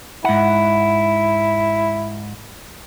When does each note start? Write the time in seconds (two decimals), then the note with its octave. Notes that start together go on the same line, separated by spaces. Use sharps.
0.24 G#2 E4 F#5